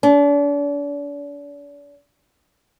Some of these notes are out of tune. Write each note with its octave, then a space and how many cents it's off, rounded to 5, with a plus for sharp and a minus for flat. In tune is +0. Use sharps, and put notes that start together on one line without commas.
D4 -40